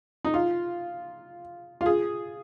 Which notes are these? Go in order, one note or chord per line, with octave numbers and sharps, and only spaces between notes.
D#4
F4
F4
G#4